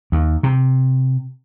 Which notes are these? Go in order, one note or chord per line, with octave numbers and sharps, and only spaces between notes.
D#2
C3